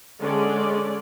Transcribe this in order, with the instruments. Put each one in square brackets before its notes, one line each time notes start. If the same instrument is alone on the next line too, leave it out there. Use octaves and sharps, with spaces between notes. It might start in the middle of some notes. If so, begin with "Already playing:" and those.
[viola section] D3 G#3 C#4 D4 G#4 D5